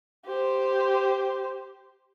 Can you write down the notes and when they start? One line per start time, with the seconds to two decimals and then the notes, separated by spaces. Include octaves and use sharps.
0.26 G4 C5